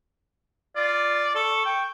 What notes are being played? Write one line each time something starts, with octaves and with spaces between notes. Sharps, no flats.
F4 D5
A4 C#6
G5